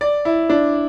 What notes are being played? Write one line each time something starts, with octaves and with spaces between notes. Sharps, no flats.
D5
E4
D4